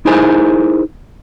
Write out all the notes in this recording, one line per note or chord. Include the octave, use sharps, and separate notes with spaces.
D#4 E4 G#4 A#4 C5 G#5